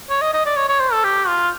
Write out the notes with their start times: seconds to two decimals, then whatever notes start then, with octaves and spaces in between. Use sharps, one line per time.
0.10 C#5
0.22 D#5
0.34 D#5
0.46 D5
0.57 C#5
0.69 C#5
0.80 C5
0.92 A4
1.04 G4
1.28 F4